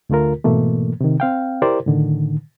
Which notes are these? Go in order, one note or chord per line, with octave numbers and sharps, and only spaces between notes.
D2 D3 A3 F4 A#4
G#2 B2 E3 A3 A#3
C3 D#3
C4 F5 G5
E4 G4 A#4 C5 D5
A2 D3 D#3